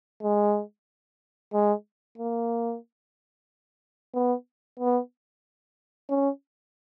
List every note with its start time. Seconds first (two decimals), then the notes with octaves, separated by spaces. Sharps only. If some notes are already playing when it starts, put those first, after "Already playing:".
0.23 G#3
1.54 G#3
2.18 A#3
4.14 B3
4.80 B3
6.10 C#4